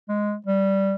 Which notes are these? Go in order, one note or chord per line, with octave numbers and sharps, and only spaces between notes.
G#3
G3